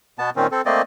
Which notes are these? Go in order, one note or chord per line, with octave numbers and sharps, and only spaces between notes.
B2 B3 A5
A#2 D#3 C4 C#4
C4 A4
A3 A#3 C4 D5 D#5